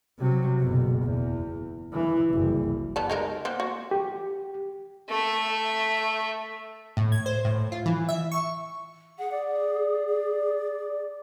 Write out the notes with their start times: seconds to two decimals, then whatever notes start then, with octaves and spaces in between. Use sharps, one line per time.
0.19 C3 F#3
0.60 F#1 B2
1.03 E2
1.93 E3
2.30 F#1 C2
2.96 G3 B3 A5
3.10 G#3 D#4 A#4
3.45 A#3 C4 F#5
3.60 F#4
3.91 G4
5.09 A3 E5
6.97 A2
7.12 G#6
7.26 C5
7.45 A2
7.72 F4
7.86 E3
8.09 E5
8.32 C#6
9.19 G#4 F#5
9.31 D5
10.09 D5